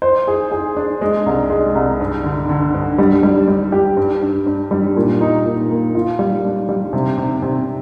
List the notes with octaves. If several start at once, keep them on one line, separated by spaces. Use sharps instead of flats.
C5
G#4
G#4
D4
G#3
C2
G#3
C2
G2
D3
D3
G2
G3
G3
G3
G4
G2
G2
G2
G3
A#2
D#4
A#2
A#3
F4
G3
D4
G3
C3
C3
C3